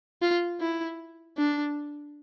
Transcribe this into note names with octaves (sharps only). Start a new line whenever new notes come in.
F4
E4
D4